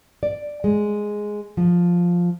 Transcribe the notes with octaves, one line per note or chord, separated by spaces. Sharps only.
D5
G#3
F3